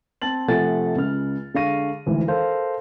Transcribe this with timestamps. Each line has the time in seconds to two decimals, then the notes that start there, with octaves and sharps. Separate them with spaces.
0.22 C4 A5 A6 F#7
0.48 C3 F3 A3 F#5 G#5 A6
0.95 C#2 C#3 F6
1.54 D3 G#3 F5 C#6 A#6 D#7
2.06 G#1 D2 E3
2.28 A4 A#4 C5 F5